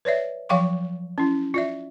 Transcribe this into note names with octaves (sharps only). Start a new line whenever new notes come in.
B4 C#5 D5 E5
F3 F#3 F5 G5 C#6 D6
C#4 E4
F4 D5 E5